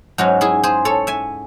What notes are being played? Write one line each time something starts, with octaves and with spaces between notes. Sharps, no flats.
G#2 F#3 C#4 D#4 F#4
E4 G#4
G#4 C5
A4 C#5
E5 G#5